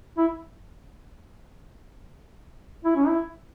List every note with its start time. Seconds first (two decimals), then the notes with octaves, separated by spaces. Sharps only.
0.17 E4
2.85 E4
2.96 C#4
3.08 E4